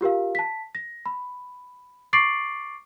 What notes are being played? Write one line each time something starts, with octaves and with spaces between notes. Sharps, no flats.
F4 G4 A#4 F5
A5 B6
A#6
B5
C#6 D6 A6 C7 D7 F#7